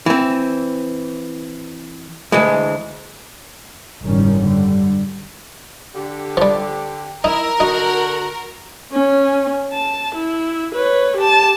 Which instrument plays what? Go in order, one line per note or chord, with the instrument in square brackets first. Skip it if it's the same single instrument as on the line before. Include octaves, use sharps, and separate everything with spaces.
[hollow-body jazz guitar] E3 C4
D2 E3 G#3
[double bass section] F#1 G#2 D#3 G3 C#4
D3 G3
[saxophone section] D3 G4
[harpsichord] F3 G3
[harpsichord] D#4 [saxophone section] E4 [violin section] A#4
[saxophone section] D3 F#4 [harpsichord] D#4
[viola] C#4
A5
E4
B4 C#5
G4 A5